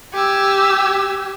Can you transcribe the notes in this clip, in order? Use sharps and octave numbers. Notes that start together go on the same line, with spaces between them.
G4 G#5 E6